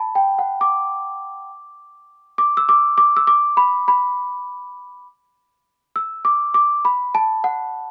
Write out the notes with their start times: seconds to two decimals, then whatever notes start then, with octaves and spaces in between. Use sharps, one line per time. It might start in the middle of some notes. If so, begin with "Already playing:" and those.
Already playing: A5 B5
0.15 G5
0.39 F#5
0.61 D6
2.38 D6
2.57 E6
2.69 D6
2.98 D6
3.17 E6
3.27 D6
3.57 B5
3.88 B5
5.96 E6
6.25 D6
6.54 D6
6.85 B5
7.15 A5
7.44 F#5